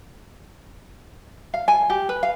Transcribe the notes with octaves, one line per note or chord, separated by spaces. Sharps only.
F5
G#5
G4
B4
F5